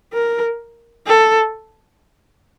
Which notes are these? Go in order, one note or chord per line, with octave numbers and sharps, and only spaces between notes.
A#4
A4